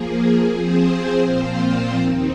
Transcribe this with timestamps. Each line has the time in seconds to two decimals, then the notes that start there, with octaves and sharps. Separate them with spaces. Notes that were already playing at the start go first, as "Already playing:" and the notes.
Already playing: F3 A#3 G#4
0.49 F3 C4 G#4 C5
1.24 A#2 F3 C4 F4 C5
1.99 D#2 D#3 C4 D#4